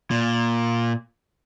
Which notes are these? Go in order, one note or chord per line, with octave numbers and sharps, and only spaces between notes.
A#2